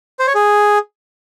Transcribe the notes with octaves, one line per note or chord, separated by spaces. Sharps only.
C5
C#5
G#4